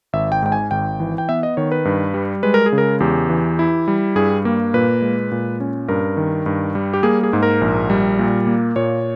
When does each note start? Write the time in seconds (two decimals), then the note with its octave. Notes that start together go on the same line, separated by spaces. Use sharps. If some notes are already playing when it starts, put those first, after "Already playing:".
0.13 G#1 E5
0.32 G5
0.43 G#2 G5
0.52 G#5
0.71 G#1 G5
1.00 E3
1.18 G5
1.29 B3 E5
1.43 D#5
1.57 D#3 C#5
1.72 B4
1.85 G2
2.14 G3
2.43 G#3 B4
2.54 A#4
2.66 G#4
2.72 C#3
2.78 A#4
3.00 E2 G4
3.29 E3
3.59 E4
3.88 G3
4.16 G2 G#4
4.45 A#3
4.74 A#2 B4
5.02 G#3
5.31 A#2
5.60 C#4
5.88 G2 A#4
6.17 D#3
6.46 G2
6.75 G3
6.94 G4
7.03 A#3 G#4
7.23 G#4
7.33 G#2
7.43 A#4
7.61 A#1
7.90 G3
8.19 A#2
8.47 A#3
8.76 A#2 C#5